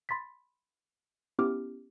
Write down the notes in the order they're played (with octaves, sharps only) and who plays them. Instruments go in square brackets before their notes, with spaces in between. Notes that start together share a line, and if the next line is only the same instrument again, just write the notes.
[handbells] B5 C6 A6 B6
B3 C#4 E4 G4 D6 F6